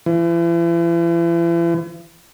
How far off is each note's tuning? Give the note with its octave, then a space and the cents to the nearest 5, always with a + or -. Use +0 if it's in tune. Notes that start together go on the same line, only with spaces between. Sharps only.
E3 +40